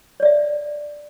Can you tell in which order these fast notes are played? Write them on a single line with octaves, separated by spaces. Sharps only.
C#5 D5 E5